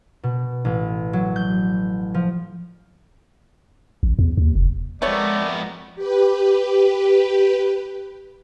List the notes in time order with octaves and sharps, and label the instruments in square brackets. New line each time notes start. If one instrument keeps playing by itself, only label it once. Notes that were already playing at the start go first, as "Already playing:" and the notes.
[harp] B2
A1
F#3
G6
F3
[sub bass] A1
E2
D#2
F1
[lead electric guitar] F2 B3 [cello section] G#3 A#4 [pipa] A3 C#5 [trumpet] D5
[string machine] G4 B4